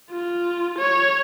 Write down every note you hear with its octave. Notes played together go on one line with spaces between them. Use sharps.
F4
C#5